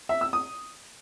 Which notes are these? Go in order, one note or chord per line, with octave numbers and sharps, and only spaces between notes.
E5
E6
D#6